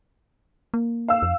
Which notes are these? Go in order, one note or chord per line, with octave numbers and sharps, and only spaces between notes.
A#3
F5 E6
F2